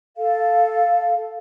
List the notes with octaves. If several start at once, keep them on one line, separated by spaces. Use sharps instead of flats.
A4 F5